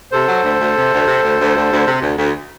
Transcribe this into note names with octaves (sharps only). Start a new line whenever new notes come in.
C3 A4 C5
F#3
D2
D2
C3
D2
C3
D2
D2
D2
D2
C3
D2
D2